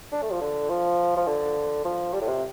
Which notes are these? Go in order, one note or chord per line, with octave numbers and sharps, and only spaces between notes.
D4
A3
F3
D3
F3
F3
D3
F3
G3
A2
C3